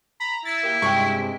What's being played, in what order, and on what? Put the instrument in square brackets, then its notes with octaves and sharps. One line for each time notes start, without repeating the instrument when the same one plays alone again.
[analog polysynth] A#5 [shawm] B5
[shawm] E4 [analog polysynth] E6 A6
[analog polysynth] A#3 G4
[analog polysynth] G2 C3 G#3 [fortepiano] G5 C#6